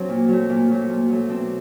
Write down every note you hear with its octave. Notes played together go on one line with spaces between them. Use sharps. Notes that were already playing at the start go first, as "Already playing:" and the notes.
Already playing: F#3 C4 D4
A#2
F#3 A3
A#2
F#3 A3
A#2
F#3 A3
B2 C4 D4